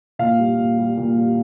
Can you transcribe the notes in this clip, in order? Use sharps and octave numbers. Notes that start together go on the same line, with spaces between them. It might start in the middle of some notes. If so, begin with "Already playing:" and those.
A#2 F5
G3
A#2
G3
A#2
G3